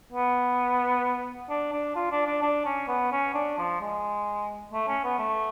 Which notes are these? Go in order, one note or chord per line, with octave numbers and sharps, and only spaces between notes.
B3
D4
D4
F4
D4
D4
D4
C#4
B3
C#4
D4
F3
G#3
A3
C#4
B3
A3